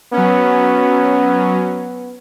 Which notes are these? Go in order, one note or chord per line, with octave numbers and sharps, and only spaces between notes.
F#3 B3 C#4